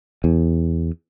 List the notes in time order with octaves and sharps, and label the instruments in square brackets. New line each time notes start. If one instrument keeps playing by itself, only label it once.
[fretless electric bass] E2